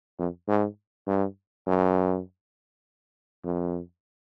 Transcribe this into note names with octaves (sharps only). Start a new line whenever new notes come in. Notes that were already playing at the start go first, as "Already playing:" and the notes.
F2
G#2
G2
F#2
F2